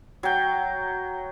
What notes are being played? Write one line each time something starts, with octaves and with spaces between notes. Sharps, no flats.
F#3 G5